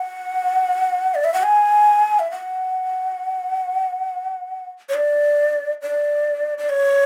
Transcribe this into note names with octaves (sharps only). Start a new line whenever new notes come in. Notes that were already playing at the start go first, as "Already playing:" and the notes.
Already playing: F#5
D5
E5
F#5
G#5
E5
F#5
C#5
D5
D5
D5
C#5